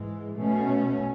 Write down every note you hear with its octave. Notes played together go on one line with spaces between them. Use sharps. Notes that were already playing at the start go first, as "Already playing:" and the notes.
Already playing: G#2 E3 G#3
B2 A3 C#4